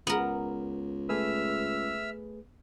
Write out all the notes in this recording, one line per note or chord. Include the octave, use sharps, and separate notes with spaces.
C#2 B3 A#4
A3 G#4 B4 E5 E6 F6